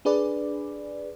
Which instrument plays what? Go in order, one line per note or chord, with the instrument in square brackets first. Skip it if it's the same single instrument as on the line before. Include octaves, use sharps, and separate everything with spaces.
[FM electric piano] D4 G#4 B4 D5